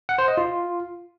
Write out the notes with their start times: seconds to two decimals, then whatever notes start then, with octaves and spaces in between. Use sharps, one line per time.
0.09 F#5
0.18 C5
0.28 D#5
0.37 F4